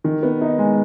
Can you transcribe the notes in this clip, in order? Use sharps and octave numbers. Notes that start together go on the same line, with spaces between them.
D#3
B3
D#4
G#3